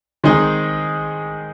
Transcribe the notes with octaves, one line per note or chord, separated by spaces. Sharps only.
D#3 G#3 C4 D#4 G#4